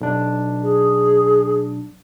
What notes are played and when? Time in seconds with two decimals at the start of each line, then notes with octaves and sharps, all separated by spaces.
0.01 B1 D4
0.63 G#4